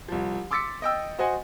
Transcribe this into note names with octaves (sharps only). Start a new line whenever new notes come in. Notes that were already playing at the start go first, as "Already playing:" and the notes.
C2 F3
C6 D6 E6 A6 B6 C#7
D#5 G5 E6
F#4 C5 D#5 F#5 G#5